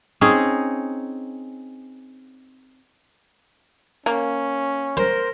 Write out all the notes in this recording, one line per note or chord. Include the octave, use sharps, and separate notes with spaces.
C4 C#4 D#4 G#4
A#3 C#4
A#4 C5